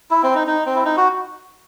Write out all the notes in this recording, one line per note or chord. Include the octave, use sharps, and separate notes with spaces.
E4
C4
D#4
D#4
C4
E4
D#4
F#4